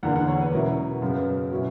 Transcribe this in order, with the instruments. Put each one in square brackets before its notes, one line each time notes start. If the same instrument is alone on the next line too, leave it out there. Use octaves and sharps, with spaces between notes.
[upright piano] E2 D3 A#3 D4 F#5
F#5
C#5
B4
B2 F#3 C#4 E4 A#4
F#2 C#3 F#3 B3
B2 F#3 C#4 E4